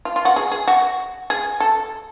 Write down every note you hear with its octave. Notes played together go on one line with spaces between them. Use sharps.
F4
F4
F#4
G#4
G#4
F#4
G#4
A4